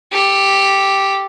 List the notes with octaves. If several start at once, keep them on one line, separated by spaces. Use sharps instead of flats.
G4 A4